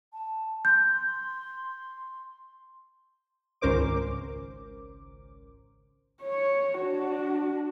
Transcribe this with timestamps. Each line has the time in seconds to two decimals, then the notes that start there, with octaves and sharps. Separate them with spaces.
0.12 A5
0.65 C6 G6
3.61 G#1 C#2 C#4 A#4 C5 D6
6.21 C#5
6.78 D4 F#4